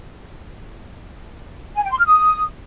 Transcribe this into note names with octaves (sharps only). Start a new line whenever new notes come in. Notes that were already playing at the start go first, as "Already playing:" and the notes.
G#5
G5
C6
F6
D#6